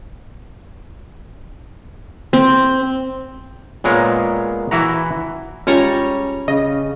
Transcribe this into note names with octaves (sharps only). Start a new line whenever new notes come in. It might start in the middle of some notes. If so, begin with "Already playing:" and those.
C4
A#2 G#3 B3 A#4 C#5
E3 E4 F#4 A#5
G3 G#3 C#4 F4 C#5 A#5
C#3 D#5